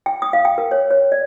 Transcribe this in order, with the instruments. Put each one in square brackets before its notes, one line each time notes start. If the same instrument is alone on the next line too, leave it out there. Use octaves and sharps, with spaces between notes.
[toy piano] G5
D#6
F5
G5
A#4
C#5
C#5
D5